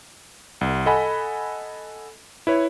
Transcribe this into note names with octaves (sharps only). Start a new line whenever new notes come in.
C2
A4 D#5 F#5 G#5 B5
E4 B4 C#5